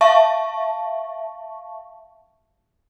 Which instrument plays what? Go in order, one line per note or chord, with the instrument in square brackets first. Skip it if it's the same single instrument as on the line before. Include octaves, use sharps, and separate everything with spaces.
[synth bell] E5 F5 A5 C#6